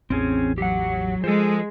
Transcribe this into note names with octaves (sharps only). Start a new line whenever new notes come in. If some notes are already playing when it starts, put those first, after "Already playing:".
A1 E2 C4 C#4 G#4
F#3 G4 F#5
F3 G#3 A4 C5